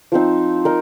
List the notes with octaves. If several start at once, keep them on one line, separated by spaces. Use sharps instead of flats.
F3 C4 D#4
D#4 A#4